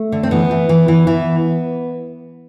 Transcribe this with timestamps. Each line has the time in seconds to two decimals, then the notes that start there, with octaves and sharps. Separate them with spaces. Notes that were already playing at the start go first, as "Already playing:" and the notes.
Already playing: A3
0.12 D3
0.23 C4
0.31 E3 B3
0.51 E3
0.69 E3
0.88 E3
1.07 E3